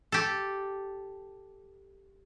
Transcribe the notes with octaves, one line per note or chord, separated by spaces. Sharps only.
G4 A4